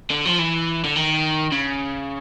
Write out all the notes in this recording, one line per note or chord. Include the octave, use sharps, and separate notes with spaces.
D3
F3
E3
D3
D#3
C#3